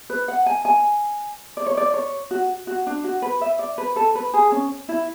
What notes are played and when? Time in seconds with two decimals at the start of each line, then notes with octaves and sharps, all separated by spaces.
0.10 B4
0.28 F#5
0.46 G#5
0.65 G#5
1.57 D5
1.66 C#5
1.77 D5
1.94 C#5
2.31 F#4
2.67 F#4
2.87 D4
3.04 F#4
3.22 B4
3.41 E5
3.59 D5
3.78 B4
3.96 A4
4.15 B4
4.34 G#4
4.52 C#4
4.89 E4